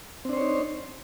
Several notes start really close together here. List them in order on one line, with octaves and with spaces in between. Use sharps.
C4 D4 C5 C#5 D#4